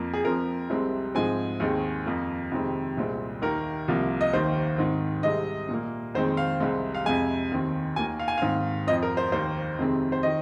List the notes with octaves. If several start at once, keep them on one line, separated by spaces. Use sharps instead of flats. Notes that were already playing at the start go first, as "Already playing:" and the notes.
Already playing: F2 F3 A#3
G#4
F2 F3 C4 A#4
C2 C3 G#3 C4
G#2 F3 G#3 C4 G#5
D#2 D#3 G#3 C4
F2 F3 A#3
F2 C3 D#3 G#3 C4
C2 A#2 G#3 C4
D#2 D#3 A#3 A#4
C2 C3 F3 A#3
D#5
D#2 D#3 A#3 C5
G#2 D#3 C4
C2 C3 G#3 C4 D#5
A#2
A#3
F2 D#3 G#3 C4 C5
F5
C2 C3 G#3 C4
F5
F2 C3 G#3 G#5
D#2 D#3 C4
D#2 D#3 A#3 G#5
F5
G#5
G#2 D#3 C4 F5
F2 F3 C4 D#5
A#4
C5
D#2 D#3 A#3 C5
F2 C3 D#3 G#3 C4
C5
D#3 D#5